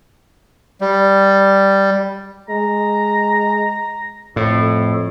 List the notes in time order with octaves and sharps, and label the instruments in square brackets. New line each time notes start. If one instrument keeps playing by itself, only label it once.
[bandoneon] G3
[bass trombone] G#3 [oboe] A#5
[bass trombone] F2 [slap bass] A2